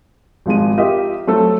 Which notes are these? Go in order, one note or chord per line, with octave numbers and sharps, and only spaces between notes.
G#1 F3 G#3 D#7
F4 G4 A#4 D#5 E5
F#3 A3 C4 A4